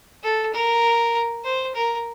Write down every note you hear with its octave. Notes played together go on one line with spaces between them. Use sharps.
A4
A#4
C5
A#4